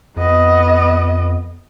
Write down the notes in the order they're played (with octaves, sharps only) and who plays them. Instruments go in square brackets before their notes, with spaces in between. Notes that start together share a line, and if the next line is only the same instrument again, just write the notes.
[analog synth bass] F2 [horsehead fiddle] B3 D#5